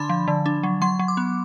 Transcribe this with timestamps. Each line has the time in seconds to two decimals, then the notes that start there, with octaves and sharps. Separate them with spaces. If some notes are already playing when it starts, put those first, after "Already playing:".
Already playing: D3 D4 B5 C6
0.09 F3
0.28 D3
0.46 D4
0.63 F#3
0.82 F#3 C6
0.99 F#3
1.08 D6
1.17 B3